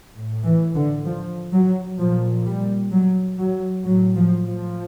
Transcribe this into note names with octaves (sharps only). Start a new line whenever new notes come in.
A2
E3
D3
F3
F#3
A#2 F3
G3
F#3
F#3
A2 F#3
F3
F3